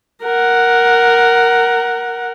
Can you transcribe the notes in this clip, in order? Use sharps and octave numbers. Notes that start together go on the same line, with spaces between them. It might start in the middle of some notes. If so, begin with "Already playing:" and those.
A#4 F#5